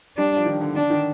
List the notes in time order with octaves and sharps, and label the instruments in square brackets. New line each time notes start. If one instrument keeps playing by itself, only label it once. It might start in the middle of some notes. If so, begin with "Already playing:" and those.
[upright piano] G3 [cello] D4
[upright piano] F3
D#3
D3
[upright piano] D3 [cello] D4
[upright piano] D#3